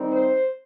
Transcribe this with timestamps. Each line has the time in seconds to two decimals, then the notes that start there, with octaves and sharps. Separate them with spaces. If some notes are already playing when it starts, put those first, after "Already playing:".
Already playing: D#3 G3 C4 D#4
0.13 C5